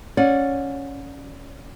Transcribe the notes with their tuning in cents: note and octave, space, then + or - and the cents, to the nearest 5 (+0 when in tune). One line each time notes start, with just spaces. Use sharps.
C#4 +0 D5 +0 F#5 -30